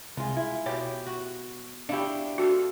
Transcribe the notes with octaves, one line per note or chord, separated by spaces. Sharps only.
C2 G#3 F4
E4
B2 G4 C#5 G5
F#4
D4 E4 G4 C#5 F5
C4 F#4 A4 F5